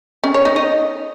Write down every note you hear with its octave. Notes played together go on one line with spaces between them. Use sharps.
C#4
C#5
D#4
D#5